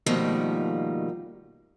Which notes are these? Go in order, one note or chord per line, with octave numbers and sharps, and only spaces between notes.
B2 D#3 F3 G3 A3 A#3